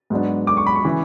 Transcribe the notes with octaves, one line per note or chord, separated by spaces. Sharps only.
G#2 F#3 B3 D4
D6
C#6
B5
C#6
C#3 E3